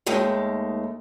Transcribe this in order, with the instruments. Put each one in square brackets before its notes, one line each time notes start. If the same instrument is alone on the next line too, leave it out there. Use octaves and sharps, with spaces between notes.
[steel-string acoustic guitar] D#2 D#3 G#3 A3